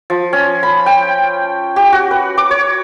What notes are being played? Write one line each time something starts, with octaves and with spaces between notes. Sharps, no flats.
F3
C#4
B5
G5
G4
F#4
B4
D6
C#5